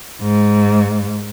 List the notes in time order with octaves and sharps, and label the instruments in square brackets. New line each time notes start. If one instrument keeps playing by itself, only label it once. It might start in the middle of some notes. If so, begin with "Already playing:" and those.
[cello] G#2